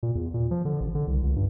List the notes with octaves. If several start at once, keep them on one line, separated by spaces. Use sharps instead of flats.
A#2
E2
A#2
F3
D3
A1
D3
C2
C#2
G2